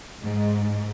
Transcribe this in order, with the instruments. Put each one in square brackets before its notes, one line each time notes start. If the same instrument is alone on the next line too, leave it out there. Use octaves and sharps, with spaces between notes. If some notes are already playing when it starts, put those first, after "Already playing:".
[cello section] G#2